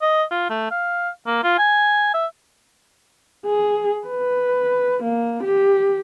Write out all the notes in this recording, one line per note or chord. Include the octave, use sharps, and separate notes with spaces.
D#5
F4
A3
F5
A#3
F4
G#5
E5
G#4
B4
A#3
G4